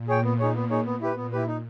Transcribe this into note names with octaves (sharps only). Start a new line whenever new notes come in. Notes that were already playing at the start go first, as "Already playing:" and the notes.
Already playing: A#2
G#4 C#5 G5
B3
D#4 G#4 C#5
B3
D#4 G#4 C#5
B3
E4 G4 B4
A#2 B3
E4 G4 B4
D#4